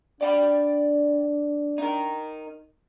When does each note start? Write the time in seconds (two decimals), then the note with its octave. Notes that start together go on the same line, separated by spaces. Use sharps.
0.21 D4 D5 G5 B5
1.78 D#4 A#4